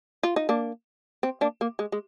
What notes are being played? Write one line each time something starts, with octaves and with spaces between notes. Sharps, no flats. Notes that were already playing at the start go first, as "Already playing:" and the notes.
F4
D#4
A#3 D4
C4
A#3 D4
A#3
G#3
G#3